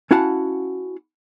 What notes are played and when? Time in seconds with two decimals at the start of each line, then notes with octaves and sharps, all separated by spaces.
0.11 C#4 E4 F#4 F5 F#5 A5